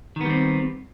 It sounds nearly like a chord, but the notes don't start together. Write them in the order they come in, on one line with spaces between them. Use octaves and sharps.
D#3 B3 G3 C4